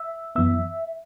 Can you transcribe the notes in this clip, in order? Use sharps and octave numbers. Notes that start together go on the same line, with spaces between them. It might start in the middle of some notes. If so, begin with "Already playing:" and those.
Already playing: E5
F#2 E3 B3 E5